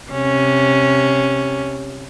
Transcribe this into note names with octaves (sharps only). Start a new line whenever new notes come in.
C3 C#4